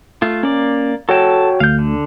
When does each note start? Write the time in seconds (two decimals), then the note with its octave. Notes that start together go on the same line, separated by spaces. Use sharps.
0.22 A3 F4
0.43 A#3 C#4 D5
1.09 F#4 A4 C#5 G5 A5
1.60 D2 F5 G6
1.79 D3